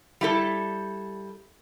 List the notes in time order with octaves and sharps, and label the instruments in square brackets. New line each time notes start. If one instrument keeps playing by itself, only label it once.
[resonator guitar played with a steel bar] G3 E4 A4